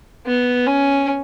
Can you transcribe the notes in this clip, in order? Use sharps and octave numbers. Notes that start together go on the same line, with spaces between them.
B3
C#4